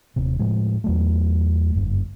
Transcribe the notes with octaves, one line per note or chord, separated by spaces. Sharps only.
D#1 C3
A2 F3 G#3
E2 F#3 A3
F#1 G2